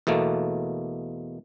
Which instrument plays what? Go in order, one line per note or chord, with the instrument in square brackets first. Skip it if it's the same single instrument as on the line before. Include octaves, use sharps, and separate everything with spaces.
[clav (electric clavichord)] E2 B2 A3 A#3